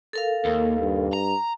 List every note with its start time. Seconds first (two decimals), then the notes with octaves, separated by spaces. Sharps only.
0.13 A4 A#4 F5
0.45 D#2 A#3
0.80 G2
1.13 A#5